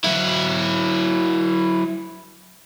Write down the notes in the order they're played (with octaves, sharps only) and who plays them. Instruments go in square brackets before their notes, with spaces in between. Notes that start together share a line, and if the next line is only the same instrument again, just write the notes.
[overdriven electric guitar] F#3 E4